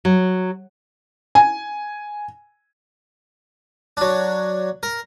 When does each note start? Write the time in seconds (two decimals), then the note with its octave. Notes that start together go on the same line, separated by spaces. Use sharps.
0.05 F#3
1.35 G#5
3.97 F#3 D4
4.83 A#4